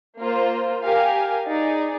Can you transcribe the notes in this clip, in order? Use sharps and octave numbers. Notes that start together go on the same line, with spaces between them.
A#3 F4 C5
G4 A#4 F5 G#5
D#4 G#4 D5